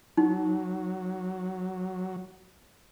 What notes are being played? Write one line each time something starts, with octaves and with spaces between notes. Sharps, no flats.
F#3 D#4